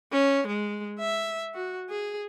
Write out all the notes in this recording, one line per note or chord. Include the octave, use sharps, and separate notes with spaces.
C#4
G#3
E5
F#4
G#4